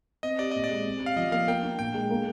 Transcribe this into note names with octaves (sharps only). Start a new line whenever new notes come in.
C4 D#5
G4 D5
A#2 D#5
D5
G#3
C4
G4
F5
F3 D#5
A#3 F5
A#3 G5
D4
A#2 G5
G#3
A#3